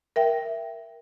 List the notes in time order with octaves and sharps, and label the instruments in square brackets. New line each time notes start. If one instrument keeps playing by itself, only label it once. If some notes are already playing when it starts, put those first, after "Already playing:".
[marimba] A#4 E5 G5